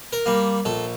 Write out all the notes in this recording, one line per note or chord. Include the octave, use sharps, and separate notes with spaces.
A#4
G3 A#3
A#1 A4